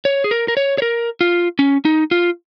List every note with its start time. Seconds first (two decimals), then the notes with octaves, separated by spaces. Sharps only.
0.05 C#5
0.24 G#4
0.31 A#4
0.48 A#4
0.57 C#5
0.78 C#5
0.82 A#4
1.21 F4
1.59 C#4
1.85 D#4
2.11 F4